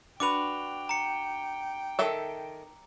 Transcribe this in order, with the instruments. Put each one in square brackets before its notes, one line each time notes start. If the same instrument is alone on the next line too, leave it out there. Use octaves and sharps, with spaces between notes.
[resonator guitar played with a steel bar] D4 F#4 B4 [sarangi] G5 [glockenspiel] D6 F7
[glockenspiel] A#5 C#7
[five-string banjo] D#3 A4 E5